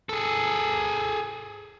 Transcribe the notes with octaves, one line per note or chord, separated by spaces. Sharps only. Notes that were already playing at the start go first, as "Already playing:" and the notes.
G#4 A4